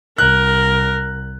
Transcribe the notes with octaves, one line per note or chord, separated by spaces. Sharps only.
C2 A#4 F#6